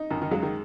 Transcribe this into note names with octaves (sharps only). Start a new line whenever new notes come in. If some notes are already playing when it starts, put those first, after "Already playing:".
Already playing: D#4
F#2 D#3
D#3
C#3 F#3 G#3
D#3